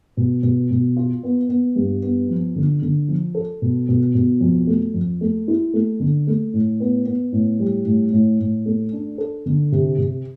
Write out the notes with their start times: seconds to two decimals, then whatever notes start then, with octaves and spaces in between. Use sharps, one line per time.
0.17 B2
0.43 B2
0.71 B2
0.97 F4
1.23 B3
1.49 B3
1.76 G2
2.02 B3
2.29 F3
2.56 D3
2.82 D3
3.08 F3
3.35 A4
3.62 B2
3.89 B2
4.15 B2
4.41 F2
4.67 A3
4.94 F2
5.21 A3
5.48 E4
5.74 A3
6.00 D3
6.27 A3
6.53 A2
6.80 B3
7.06 B3
7.32 A2
7.60 G3
7.86 A2
8.12 A2
8.40 A2
8.66 A3
8.93 D4
9.18 A4
9.46 D3
9.72 C3
9.98 C3